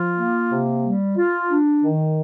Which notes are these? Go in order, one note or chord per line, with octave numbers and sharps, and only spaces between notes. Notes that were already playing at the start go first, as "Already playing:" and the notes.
Already playing: F3 F4
A#3
C3
G3
F4
D4
D#3